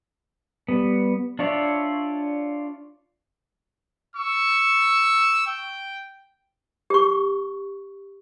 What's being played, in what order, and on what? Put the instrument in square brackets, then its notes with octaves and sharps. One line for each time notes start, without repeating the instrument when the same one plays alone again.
[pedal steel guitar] G3 B3
D4 F4 C#5 D5 E5
[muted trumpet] C#6 [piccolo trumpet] E6
[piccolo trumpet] G5
[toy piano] G4 C#6